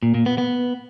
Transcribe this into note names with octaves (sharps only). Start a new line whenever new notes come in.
A#2
A#2
B3
B3